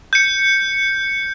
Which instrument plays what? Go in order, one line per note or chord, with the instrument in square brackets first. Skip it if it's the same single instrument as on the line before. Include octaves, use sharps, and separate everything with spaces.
[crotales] G6 C#7